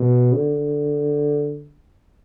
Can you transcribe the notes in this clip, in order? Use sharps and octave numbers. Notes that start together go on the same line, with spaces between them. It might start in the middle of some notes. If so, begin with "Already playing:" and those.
Already playing: B2
D3